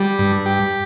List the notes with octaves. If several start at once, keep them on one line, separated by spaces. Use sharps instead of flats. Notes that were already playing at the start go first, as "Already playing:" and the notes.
Already playing: G3
G2
G4